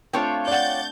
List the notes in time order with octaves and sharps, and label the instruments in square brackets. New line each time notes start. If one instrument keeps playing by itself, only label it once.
[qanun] A3 C4 D4 [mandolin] F4 C#5 G5
[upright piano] D5 F#5 [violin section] G6 A6